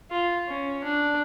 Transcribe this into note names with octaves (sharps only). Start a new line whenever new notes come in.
F4
C#4
D4